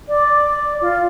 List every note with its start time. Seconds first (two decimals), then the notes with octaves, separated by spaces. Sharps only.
0.08 D5
0.81 F4